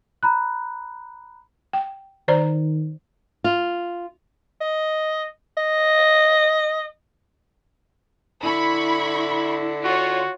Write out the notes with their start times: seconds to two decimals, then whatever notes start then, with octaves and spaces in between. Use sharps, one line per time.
0.23 A#5 B5 F#6
1.73 G5
2.28 D#3 C5 D5 A#5
3.44 F4
4.61 D#5
5.57 D#5
8.44 D3 E4 B5 C#6
9.84 F4 F#4 C#5